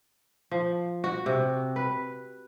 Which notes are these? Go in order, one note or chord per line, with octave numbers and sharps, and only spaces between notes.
F3
F#4
C3
B4